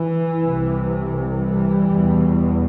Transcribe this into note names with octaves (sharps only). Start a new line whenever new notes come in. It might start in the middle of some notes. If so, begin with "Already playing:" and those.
Already playing: E3
C2 C3
E3 G3
E2 B2